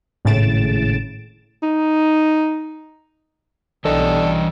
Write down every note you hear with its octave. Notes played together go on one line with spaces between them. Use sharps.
G#1 A2 C#3 A6 D7 E7
D#4
B1 D3 E3 G3 C#4 A4 D#5 G5